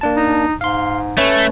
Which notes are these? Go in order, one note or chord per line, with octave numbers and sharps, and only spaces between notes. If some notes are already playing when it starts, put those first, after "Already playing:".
A#3 D4 A5
D#4
G#2 F5 C6
A3 C#4 B4 C#5